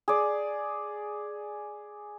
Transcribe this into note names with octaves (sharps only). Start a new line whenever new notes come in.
G#4 D5